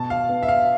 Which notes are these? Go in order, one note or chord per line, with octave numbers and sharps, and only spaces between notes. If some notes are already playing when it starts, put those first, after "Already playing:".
Already playing: B2 A5
F5
B3
E5
F5